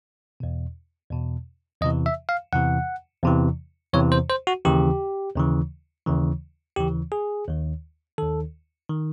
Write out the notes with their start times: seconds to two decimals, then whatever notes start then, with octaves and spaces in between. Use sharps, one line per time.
0.40 E2 B2
1.11 E2 B2
1.81 E2 C3 E3 D#5
2.06 E5
2.29 F5
2.52 E2 C3 E3 F#5
3.23 E2 C3 E3
3.94 E2 C3 E3 C#5
4.12 C5
4.30 C5
4.47 F#4
4.65 D#2 C#3 E3 G4
5.36 D#2 C#3 E3
6.07 D#2 C#3 E3
6.76 D#2 C#3 E3 G4
7.12 G#4
7.47 D#2 D#3
8.18 D#2 D#3 A4
8.89 D#3